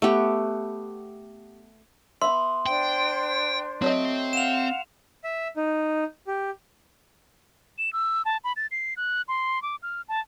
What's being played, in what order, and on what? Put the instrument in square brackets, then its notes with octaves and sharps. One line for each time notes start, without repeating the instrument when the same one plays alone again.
[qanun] A3 B3 G4
[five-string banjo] B3 E5 [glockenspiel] C6
[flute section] D4 C5 [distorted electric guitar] G5
[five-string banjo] F#3 A3 D#5 [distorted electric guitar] C4
[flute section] F5 F#5 [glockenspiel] E7 F7
[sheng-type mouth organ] E5
D#4
G4
[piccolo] E7
E6
A5
B5
A6
C7
F#6
C6
D6
F6
A5